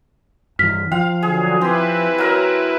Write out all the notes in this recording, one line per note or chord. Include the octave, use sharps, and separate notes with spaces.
G2 E3 F6 B6
F3 F5 G5
D3 F#3 G#4
C4 E4 G4 B4
F#3 A#4 E5